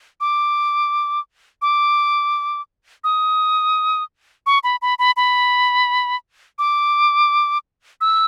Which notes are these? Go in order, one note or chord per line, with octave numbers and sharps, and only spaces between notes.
D6
D6
D#6
C#6
B5
B5
B5
B5
D6
E6